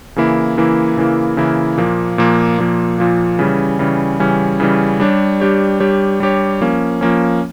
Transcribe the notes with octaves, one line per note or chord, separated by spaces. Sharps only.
C#3 E3 A#3 E4
C#3 E3 A#3 E4
C#3 E3 A#3 E4
C#3 E3 A#3 E4
A#2 F3 A#3
A#2 F3 A#3
A#2 F3 A#3
A#2 F3 A#3
C#3 E3 G3 C#4
C#3 E3 G3 C#4
C#3 E3 G3 C#4
C#3 E3 G3 C#4
G3 D4 G4 C#5
G3 D4 G4 C#5
G3 D4 G4 C#5
G3 D4 G4 C#5
F3 A#3 C#4
F3 A#3 C#4